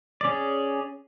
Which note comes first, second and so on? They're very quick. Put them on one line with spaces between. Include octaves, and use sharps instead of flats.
D5 C#4 G#4